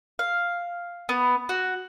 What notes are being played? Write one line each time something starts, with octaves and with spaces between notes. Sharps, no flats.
F5
B3
F#4